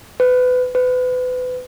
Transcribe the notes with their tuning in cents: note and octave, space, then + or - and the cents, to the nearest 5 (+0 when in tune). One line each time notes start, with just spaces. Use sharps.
B4 +25
B4 +30